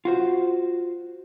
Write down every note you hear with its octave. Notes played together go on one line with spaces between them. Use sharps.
F4 F#4 C5